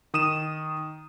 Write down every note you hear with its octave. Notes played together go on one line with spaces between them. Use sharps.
D#3 D#6 D#7 E7